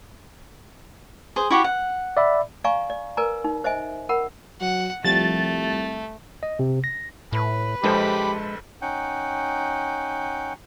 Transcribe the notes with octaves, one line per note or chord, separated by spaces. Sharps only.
G#4 C5
E4 F#4 G4
F#5
D5 E5 B5
D5 F5 G#5 A#5 C#6
D5
A#4 B4 D5 G#5 A#5
D#4
C5 D#5 E5 G#5
A#4 F#5 B5
F#3 F#5
C2 F3 G3 A3 A6
D#5
C3
A#6
A2 B4
A#1 G#3 G4 A4 C5 B5
C#4 D#4 F#5 G5